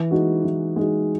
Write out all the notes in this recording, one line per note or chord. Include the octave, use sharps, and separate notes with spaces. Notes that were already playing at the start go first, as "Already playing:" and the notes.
Already playing: E3
G#3 D#4 F#4
E3
G#3 D#4 F#4